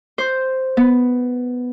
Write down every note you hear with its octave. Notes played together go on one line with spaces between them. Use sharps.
C5
B3